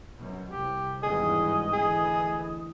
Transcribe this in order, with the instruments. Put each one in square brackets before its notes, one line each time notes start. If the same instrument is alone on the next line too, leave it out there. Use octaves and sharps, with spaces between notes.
[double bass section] F#2 B2
[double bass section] C2 C3 [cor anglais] G4
[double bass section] G#1 E2 G2 [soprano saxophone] G#4 [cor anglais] D#5
[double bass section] D2 E3 [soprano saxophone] G#4